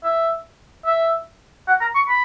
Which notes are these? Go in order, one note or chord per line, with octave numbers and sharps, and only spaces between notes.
E5
E5
F#5
A#5
C#6
B5